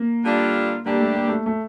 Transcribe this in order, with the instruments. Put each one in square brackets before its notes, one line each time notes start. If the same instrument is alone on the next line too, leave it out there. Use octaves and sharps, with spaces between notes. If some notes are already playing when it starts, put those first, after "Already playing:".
Already playing: [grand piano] A#3
[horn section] D3 G3 D4 F4
[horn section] D3 G3 D4 G4 [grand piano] A#3
[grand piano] A3
A#3
A3
A3